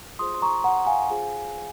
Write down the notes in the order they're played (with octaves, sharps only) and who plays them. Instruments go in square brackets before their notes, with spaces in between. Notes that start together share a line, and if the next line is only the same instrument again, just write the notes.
[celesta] F4 G#4 C5 C6 D#6
C6
A#5 C#6
F#5 A#5
F5 G#5
F4 G#4 C5